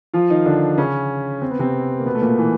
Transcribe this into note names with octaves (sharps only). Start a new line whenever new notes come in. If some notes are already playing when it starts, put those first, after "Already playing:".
F3 F4
D#3 D#4
D3 D4
C#3 C#4
C4
B3
C3 C4
A#3
B2 B3
A3
A#2 A#3
E3